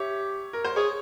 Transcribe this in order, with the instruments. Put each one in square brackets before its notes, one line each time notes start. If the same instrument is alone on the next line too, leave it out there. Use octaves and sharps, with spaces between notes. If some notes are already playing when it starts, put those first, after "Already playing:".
Already playing: [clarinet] G4 [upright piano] C#5 E5
[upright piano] A#4
C5
[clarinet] G#4 [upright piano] C#5